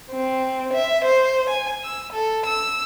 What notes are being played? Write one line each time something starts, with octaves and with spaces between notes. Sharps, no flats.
C4
E5
C5
G#5
E6
A4
E6